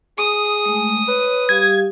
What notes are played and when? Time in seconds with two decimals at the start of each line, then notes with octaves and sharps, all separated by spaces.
0.18 G#4 D#6
0.66 G#3 A3
1.08 B4 C#5
1.49 G3 G4 F5 G#6